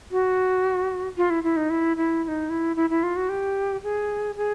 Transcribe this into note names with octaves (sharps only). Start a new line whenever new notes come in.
F#4
F4
E4
E4
D#4
E4
E4
E4
D#4
E4
E4
E4
F4
F#4
G4
G#4
G#4